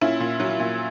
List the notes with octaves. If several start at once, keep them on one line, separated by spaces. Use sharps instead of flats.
A#2 C#4 E4
A#2
F#3
A#2